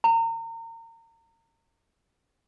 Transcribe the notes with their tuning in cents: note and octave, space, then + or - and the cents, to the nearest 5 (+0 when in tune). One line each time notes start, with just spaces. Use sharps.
A#5 -30